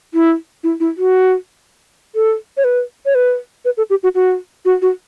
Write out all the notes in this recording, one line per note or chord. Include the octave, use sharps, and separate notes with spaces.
E4
E4
E4
F#4
A4
C#5
B4
C#5
B4
B4
A4
G4
F#4
F#4
F#4
F#4